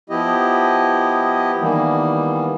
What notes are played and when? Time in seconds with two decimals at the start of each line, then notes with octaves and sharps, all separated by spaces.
0.10 F3 B3 E4 G4 D#5
1.60 D#3 E3 G3 A#3 B3